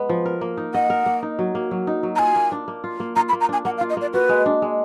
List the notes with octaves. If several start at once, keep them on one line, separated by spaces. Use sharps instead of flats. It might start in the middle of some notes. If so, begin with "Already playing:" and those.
Already playing: G#3 B3
F3
A#4
A#3
D#4
D#5 F#5
A#4
A#3
D#4
F#3
A#3
F#3
D#4
F#3
A#5
F4 G#5
A#3
D4
A#3
F4
A#3
F4 A#5
B5
A#3
A#5
D4 G#5
A#3 F#5
F5
F4
D#5
A#3 D5
F#4 B4
G#3
D4
G#3